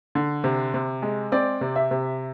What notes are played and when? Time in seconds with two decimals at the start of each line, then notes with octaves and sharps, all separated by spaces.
0.15 D3
0.44 C3
0.74 C3
1.02 G#3
1.32 C4 D5
1.61 C3
1.76 E5
1.91 C3